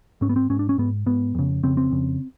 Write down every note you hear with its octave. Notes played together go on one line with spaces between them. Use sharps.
G#2 C#4
B3
C4
G#2 C#4
D4
C#4
G#2 B3
G#2 B3
F2 C#3
F2 C#3 C4
C4
F2 C#3